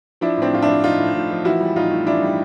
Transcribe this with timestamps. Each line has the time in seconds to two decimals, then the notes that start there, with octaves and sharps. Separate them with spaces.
0.21 F3 D4 E4
0.38 A2 C4 D4
0.53 A2 F4
0.62 D4 E4
0.68 F3
0.84 F3 D#4 F4
1.00 A2
1.15 A2
1.31 F3
1.45 E3 E4 F#4
1.60 G3
1.76 A2 D#4 F4
1.91 A2
2.06 E3 D4 E4
2.22 G3